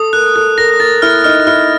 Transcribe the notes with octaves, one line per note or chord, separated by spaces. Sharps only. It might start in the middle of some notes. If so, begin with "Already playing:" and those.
Already playing: A4 D#6
A#4 F#6
A4 F#6
A#4 A#6
A#4 A6
E4 F6
D#4 F6
E4 F6